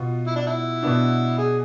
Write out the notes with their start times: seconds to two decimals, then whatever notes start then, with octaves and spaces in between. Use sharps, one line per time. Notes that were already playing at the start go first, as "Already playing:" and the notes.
Already playing: B2 B3 F4
0.27 E4
0.36 D4
0.46 E4
0.83 B2 B3 D4
1.38 G#4